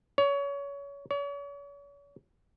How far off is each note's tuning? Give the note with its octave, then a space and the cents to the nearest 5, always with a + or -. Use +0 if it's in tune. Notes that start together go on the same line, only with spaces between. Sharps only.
C#5 +25
C#5 +40